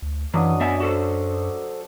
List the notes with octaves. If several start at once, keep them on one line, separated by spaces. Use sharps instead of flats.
D2
F#2 E3 F#3 D4 D#5
B3 E5 G#5
F#4 A4 C5